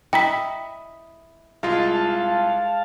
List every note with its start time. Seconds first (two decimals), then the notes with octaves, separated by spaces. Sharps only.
0.13 E4 D#5 G5 A#5 B6
1.63 C2 G#3 F4 F5 A5